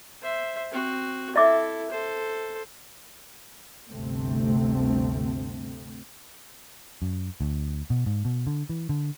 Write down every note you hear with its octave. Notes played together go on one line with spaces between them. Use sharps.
C5 E5
C4 F#4
E4 A4 D#5 E5 D6
A4 C5
G1 D2 C3 A3 C4
F#2
D2
B2
G#2
B2
D3
E3
D3